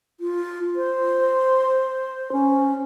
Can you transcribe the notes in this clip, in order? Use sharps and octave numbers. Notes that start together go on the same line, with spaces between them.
F4
C5
C#4